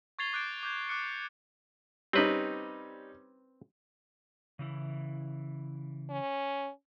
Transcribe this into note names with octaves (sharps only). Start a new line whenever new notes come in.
C#6 G#6 A6 C7 F7 G7
D6 F#6 G6 A6 D7
D6 G6 G#6
D6 F#6 C#7
G3 C4 C#4 D#4 B4
C#3 E3 E4
C#4